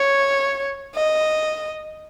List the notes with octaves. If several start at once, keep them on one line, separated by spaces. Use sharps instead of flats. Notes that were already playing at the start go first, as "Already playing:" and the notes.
Already playing: C#5
D#5